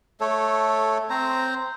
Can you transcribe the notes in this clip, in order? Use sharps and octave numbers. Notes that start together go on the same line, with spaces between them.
A3 A4 C#5
C4 C5 A#5